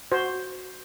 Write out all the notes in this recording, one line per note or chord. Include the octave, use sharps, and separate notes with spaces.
F#4 C5